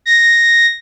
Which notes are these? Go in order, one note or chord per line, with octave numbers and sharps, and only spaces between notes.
A#6